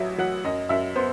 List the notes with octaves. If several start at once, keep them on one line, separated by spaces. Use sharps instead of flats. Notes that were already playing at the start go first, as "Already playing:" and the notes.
Already playing: A1 F#3 E5
F#3 F#5
F#2 D#5
F#2 E5
B3 C5